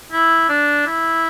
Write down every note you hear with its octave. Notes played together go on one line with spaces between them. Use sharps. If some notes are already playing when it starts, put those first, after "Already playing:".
E4
D4
E4